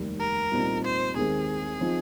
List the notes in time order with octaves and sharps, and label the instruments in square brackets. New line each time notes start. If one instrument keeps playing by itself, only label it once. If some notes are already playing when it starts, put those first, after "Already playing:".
Already playing: [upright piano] F1 D#2 D#3 G3 A#3
[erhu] A#4
[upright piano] C2 A#2 G3 C4 D#4
[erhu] C5
[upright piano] D#2 D#3 G#3 C4 [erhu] G#4
[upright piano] F3 C4 D#4